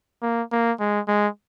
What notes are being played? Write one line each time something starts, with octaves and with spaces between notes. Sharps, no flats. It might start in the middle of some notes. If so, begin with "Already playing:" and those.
A#3
A#3
G#3
G#3